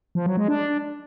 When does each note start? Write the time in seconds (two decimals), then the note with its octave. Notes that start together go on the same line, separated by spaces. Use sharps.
0.15 F3
0.26 F#3
0.37 G#3
0.48 D4